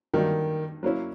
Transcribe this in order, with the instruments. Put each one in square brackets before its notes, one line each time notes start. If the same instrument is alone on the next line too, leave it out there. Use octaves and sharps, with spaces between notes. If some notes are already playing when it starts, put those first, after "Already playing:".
[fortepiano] G2 D3 F#3 A#3 D#4 [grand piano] D#3
[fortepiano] F#3 A#3 C#4 E4